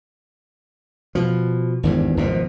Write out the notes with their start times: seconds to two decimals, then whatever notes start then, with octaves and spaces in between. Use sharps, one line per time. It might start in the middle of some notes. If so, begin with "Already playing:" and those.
1.15 B2 F3
1.83 G#1 E2 G2
2.17 G#1 B2 D#3 F3